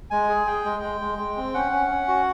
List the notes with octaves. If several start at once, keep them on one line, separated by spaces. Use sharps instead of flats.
G#3 G#5
G#4
G#4 G5
G#3
G#3
G#3
G#3
C4
C#4 F#5
C#4
C#4
F#4